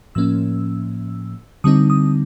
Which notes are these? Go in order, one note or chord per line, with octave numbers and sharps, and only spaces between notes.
A2 F3 A#3 C#4 E6
D3 G3 C4 D#4 D#6
D#6